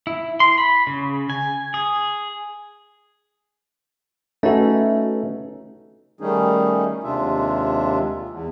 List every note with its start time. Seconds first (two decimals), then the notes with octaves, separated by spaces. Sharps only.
0.07 E4
0.40 C6
0.58 B5
0.87 C#3
1.30 G#5
1.74 G#4
4.43 A3 C#4 D#4 F#4 B4 E5
6.21 D#3 G3 A3 C#4 D#4 G#4
7.04 D#2 C3 G#3 D4 F4 E5
8.29 E2